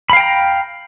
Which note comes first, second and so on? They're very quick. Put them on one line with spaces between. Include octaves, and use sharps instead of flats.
B5 F5 G5 A#5